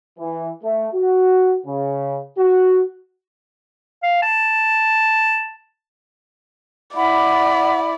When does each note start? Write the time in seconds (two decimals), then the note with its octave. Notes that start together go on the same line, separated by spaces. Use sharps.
0.19 E3
0.63 A3
0.94 F#4
1.66 C#3
2.38 F#4
4.03 F5
4.22 A5
6.96 E4 D5 F#5 B5